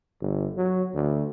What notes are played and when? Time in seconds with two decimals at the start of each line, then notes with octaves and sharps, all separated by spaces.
0.21 G1
0.57 F#3
0.94 D2